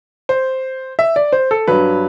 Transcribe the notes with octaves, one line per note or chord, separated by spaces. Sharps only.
C5
E5
D5
C5
A4
G2 F#3 B4